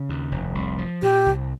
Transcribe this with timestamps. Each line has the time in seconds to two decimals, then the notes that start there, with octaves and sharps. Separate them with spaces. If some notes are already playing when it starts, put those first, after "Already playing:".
Already playing: C#3
0.09 D#2
0.32 F1
0.55 C2
0.78 F3
1.02 A#2 G4
1.26 C2